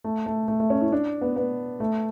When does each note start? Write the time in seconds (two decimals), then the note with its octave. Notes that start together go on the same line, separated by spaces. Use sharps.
0.04 A3
0.26 A3
0.48 A3
0.60 A3
0.70 C#4
0.81 E4
0.92 D4
1.21 B3
1.36 B3
1.80 A3